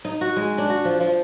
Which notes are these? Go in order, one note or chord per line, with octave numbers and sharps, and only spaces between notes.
D#4
F#4
G#3
D4
F#4
F3
F3